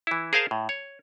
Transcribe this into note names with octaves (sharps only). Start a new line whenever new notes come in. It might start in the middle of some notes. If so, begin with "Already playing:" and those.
E3 E4
G#4 A#4 C5 F5 G#5 A5
A2
C#5